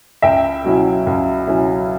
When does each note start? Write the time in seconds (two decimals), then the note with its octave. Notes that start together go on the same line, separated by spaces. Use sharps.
0.22 C#2 E5 G5
0.64 B2 F#3 C#4 E4
1.07 C#2
1.47 B2 F#3 C#4 E4